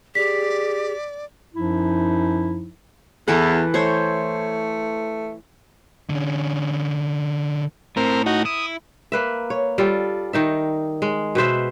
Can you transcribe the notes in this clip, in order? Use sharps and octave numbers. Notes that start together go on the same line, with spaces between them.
G4 G#4 D5 B6
F#2 F3 D#4 E4
E2 E3 A4 B4
A3 C5 C#5
D3 C#4
A2 C4 A#4
D#4 F#4
E4 D#6
A#3 B4 E5
C#5
G3 F4 A4
D#3 D#4 E5
G#3
B2 B4 C5 E5